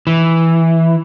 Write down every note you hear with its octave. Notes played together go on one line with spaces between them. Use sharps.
E3